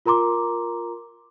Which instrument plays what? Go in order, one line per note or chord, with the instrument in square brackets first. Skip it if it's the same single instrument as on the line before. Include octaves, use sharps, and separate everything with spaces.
[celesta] F4 A#4 A#5 C6 D6